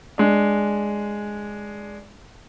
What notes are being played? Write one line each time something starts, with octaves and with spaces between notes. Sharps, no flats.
G#3 D4